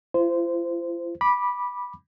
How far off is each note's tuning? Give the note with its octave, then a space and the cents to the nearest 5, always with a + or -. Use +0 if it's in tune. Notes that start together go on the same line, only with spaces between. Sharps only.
F4 -45 C5 -20
B5 -10 D6 +5